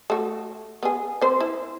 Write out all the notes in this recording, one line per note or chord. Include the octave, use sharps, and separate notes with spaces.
A3 F#4
B3 G#4
C4 C5
E4